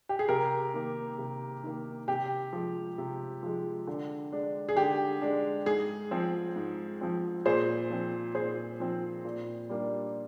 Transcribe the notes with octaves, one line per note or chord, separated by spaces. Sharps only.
G4
G#4
C3 G4 A#4
D#3 A#3
C3
D#3 A#3
C3 G4
F3 G#3
C3
F3 G#3
D3
G#3 D4
G#4
D3 G4
G#3 D4
G#2 G#4
F3 C4
G#2
F3 C4
A#2 G#4 C5
F3 C4
A#2 G#4 C5
F3 C4
A#2
G3 A#3 D4